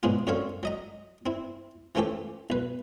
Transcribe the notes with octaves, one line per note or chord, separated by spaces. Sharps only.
G#2 B2 F#3 G#3 F4
F#2 D3 C4 C#5 F5
F#3 D#5 A#5
C4 E4
E3 F3 A3 C#4 G4 A4
B1 B4